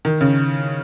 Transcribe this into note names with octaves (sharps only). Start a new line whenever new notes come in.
D#3
C#3